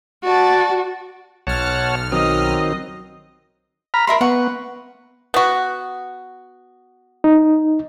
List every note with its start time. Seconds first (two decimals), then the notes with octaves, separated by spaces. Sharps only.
0.24 F#4 D5 A5
1.47 B1 C#5 F#5 A5 F6
2.12 D#3 F#3 C4 D#5 D#6
3.94 A#5 B5 F6
4.07 A#4 E5 B5 C6
4.21 B3 B4 F#5 C#6
5.34 B3 F#4
7.24 D#4